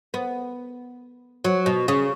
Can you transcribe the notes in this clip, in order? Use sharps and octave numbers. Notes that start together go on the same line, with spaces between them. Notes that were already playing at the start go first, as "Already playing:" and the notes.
B3
F#3
B2
C#3